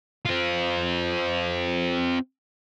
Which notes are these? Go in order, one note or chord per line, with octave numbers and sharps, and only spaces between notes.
C4 F4